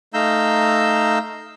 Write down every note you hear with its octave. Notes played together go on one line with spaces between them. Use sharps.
A3 D#4 F5 A#5 E6 G6